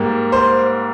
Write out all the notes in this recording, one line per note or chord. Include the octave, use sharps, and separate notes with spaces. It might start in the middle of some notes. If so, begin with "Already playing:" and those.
Already playing: G#2 G3 A#3
C5